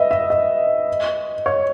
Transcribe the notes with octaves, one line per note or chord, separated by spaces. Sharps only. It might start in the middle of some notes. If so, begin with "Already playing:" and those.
Already playing: B4 D#5 E5
E5
D#5
C#5